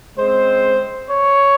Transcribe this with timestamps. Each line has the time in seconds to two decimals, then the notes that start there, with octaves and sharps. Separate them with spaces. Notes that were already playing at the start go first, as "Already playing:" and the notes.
0.17 C#3 G#3 C4 C5
1.09 C#5